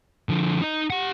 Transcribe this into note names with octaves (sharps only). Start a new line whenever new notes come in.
D3 F3
D#4 D#5
G4 F#5